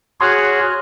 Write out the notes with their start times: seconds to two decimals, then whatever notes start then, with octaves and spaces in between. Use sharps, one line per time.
0.21 F#4 G#4 C#5 C6 F6 F#6